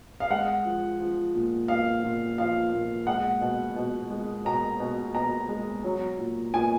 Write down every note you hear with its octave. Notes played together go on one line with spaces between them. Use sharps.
F5
G#3 F#5
F3
F3
A#2
A#2 F5
A#2
F3 F5
A#2
G#3 F#5
B2
B2
G#3
B2 A#5
B2
B2 A#5
G#3
F#3
A#2
A#2 G#5